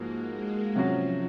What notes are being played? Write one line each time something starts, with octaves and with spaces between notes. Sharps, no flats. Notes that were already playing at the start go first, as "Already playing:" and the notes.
Already playing: G#2 F3 G#3 A#3 F#4
G#3
C3 F3 F#3 C#4 F#4